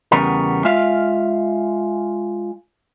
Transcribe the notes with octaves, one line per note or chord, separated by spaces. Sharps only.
E2 C#3 G3 B3 A#4
G#3 F4 E5 F5